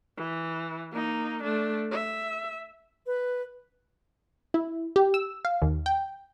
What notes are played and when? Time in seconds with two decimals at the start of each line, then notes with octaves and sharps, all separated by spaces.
0.17 E3
0.92 A#3 D#4
1.43 A3 D4
1.91 E5
3.06 B4
4.54 E4
4.96 G4
5.14 E6
5.45 F5
5.62 D#2
5.86 G5